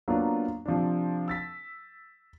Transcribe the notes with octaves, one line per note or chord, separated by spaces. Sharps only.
F#3 A#3 B3 D4 F4
C3 F3 C4 D4
E6 A6 B6